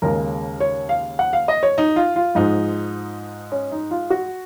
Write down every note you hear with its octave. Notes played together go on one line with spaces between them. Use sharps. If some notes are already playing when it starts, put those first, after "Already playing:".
D#2 C#3 G#3 A#4
C#5
F5
F#5
F5
D#5
C#5
D#4
F4
F4
G#2 F3 G#3 D#4
C#4
D#4
F4
F#4